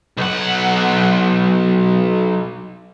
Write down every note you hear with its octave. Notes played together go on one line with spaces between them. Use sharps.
B1 F#5